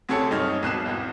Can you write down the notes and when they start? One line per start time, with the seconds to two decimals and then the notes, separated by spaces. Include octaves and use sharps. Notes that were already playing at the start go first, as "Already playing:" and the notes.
0.09 D2 C3 G#4 A4 C#5 C#7
0.31 B1 G2 D#4 C#5 F6
0.63 G#1 B2 F#6 C7 E7
0.86 G#1 E2